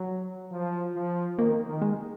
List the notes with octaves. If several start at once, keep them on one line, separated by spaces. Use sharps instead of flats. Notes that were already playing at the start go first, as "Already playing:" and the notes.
Already playing: F#3
F3
F3
D#3 A#3
D#3
G#3